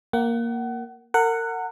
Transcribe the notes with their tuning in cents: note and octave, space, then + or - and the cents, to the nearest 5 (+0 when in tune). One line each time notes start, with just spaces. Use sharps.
A#3 +0 F#5 +30
A#4 -35 F#5 +0